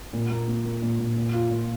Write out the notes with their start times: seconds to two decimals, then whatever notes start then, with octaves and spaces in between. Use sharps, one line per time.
0.13 A#2
0.31 A#3
0.48 A#3
0.65 A#3
0.82 A#2
0.99 A#2
1.16 A#2
1.34 F4
1.50 A#2